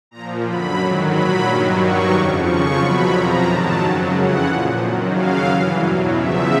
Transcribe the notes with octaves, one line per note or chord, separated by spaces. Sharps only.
A#2 F3 A#5
F#2 D3 F#3 B5
G#2 D#3 F#3
A#2 F#3 B5
G2 D#3 F#3
G2 D#3 F#3 C#6
F2 C#3 F3 D6
F2 C#3 F3 C#6
E2 B2 F#3 B5
F2 C3 F3 A#5
G#2 D#3 F#3 A5
F#2 C#3 F#3
F2 C#3 E3 F#5
A#2 F3
F#2 D#3 F#3
F#2 C#3 F#3 F5
G2 E3
E2 B2 F#3
E2 C#3 F3 E5